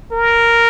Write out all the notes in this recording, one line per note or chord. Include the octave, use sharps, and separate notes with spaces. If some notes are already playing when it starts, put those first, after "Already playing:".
A#4